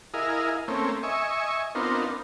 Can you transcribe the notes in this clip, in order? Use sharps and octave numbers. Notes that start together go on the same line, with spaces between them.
E4 G#4 A#4 D#5 F5
A3 A#3 C4 C#4
D#5 E5 G#5 C#6
B3 C4 D4 D#4 F4 A#4